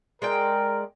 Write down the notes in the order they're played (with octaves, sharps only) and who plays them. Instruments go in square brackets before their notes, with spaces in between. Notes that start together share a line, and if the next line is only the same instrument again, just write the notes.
[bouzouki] G#3 D5 G5 [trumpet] A#4